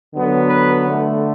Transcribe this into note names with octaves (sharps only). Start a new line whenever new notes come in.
D3 F#3 B3
B4
D3 A3